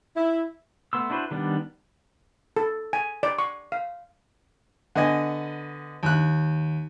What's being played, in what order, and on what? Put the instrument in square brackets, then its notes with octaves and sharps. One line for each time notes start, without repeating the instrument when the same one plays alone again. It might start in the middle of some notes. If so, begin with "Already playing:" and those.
[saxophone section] E4
[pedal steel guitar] A3 B3 C6 E6
D4 E4 F#4 B4 C5
D#3 G3 B3 D4
[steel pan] A4
G#5
D5
C#6
F5
[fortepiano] D3 B3 D#5 G#5
D#2 F#6